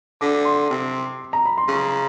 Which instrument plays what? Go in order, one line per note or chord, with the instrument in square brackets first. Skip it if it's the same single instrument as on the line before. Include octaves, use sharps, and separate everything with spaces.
[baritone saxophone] D3 [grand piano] D6
[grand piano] C6
[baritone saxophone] C3
[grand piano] A#5
B5
C6
[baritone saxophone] C#3 [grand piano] C#6